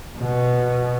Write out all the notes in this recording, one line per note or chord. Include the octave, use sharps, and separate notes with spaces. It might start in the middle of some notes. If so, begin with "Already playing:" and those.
B2